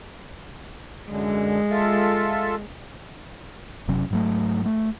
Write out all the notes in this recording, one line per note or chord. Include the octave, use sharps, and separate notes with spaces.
F#2 D3 G#3
F4 A4 E5
F#1 C3 F#3 C#4
G#2 F#3 A3
A3